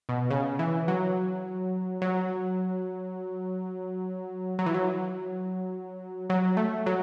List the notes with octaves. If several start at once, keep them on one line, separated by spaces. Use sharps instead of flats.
B2
C#3
E3
F#3
F#3
F#3
E3
F#3
F#3
A3
F#3